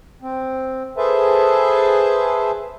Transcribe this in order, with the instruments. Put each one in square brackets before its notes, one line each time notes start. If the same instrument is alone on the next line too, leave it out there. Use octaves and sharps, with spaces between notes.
[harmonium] C4
G#4 A4 B4 C5 E5 A5